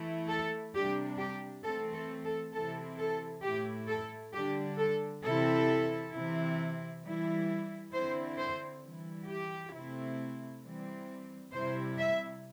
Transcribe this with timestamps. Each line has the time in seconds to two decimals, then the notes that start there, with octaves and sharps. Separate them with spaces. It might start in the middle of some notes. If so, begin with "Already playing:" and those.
Already playing: E3 A3 E4
0.29 A4
0.74 C3 G3 D4 G4
1.18 G4
1.63 E3 A3 C4 A4
1.93 A4
2.24 A4
2.53 C3 E3 C4 E4 A4
2.98 A4
3.43 A2 A3 E4 G4
3.88 A4
4.33 D3 G3 D4 G4
4.78 A4
5.23 C3 E3 C4 E4 A4
6.13 C3 E3 C4 E4
7.04 E3 G3 E4
7.93 D3 C4 E4 C5
8.38 C5
8.82 E3 G3 E4
9.28 G4
9.73 C3 A3 C4 E4
10.63 E3 G3 C4
11.52 C3 G3 E4 C5
11.98 E5